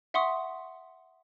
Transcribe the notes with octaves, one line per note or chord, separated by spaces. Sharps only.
E5 F#5 C6 C#6 D#6